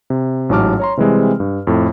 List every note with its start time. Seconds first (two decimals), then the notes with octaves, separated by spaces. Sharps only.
0.10 C3
0.49 A1 G#2 F#3 A5 D6 F6
0.80 C#5 A#5 C6
0.97 C3 E3 G3 G#3 C4
1.40 G2
1.67 F2 A2